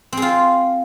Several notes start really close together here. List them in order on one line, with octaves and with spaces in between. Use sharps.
C4 G#4 F4